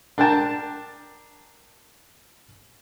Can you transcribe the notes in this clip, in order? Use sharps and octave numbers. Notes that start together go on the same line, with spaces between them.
D4 A#4 G5 A5